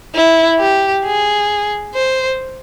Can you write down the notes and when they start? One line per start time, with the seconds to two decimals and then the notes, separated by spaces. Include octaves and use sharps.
0.15 E4
0.60 G4
1.05 G#4
1.95 C5